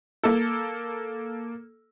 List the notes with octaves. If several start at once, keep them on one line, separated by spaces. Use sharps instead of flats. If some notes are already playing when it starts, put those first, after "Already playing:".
A#3 A4